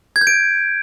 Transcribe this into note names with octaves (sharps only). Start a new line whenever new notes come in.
G#6
G6
D7